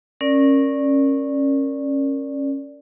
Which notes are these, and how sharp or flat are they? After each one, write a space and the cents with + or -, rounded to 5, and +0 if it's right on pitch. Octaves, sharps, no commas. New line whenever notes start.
C#4 -20 A#4 +0 D5 +0